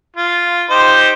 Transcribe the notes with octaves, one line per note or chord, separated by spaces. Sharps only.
F4
D#4 G4 C5